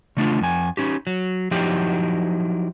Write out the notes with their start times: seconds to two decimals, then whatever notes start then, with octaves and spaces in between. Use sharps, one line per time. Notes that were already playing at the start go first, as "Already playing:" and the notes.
0.17 C#3 A3 D4 F4
0.41 F2 G#5
0.77 C#4 D#4 G4
1.07 F#3
1.51 F3 F#3 D#4 E4 G4